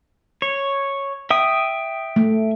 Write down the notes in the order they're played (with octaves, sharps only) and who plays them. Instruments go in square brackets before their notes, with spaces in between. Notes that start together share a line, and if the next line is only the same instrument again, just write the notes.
[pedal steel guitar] C#5
E5 G5 D#6
[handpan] A3